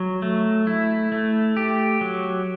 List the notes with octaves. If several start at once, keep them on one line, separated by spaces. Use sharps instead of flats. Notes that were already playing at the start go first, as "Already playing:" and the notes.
Already playing: F#3
A3
E4
A3
G4
F#3